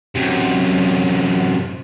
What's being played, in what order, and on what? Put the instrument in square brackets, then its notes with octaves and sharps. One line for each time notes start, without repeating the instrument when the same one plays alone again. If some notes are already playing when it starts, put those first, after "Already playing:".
[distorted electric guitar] F#2 C3